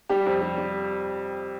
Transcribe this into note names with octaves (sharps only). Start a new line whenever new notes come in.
G3 G4
F2
G3
G3